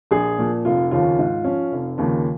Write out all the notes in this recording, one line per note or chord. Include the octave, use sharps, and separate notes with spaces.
A#1 G#4
A#2 F3
F1 F4
D#2 C#3 F3 C#4 F4
G#2
F3 C#4
F1
D#2 C#3 F3 A#3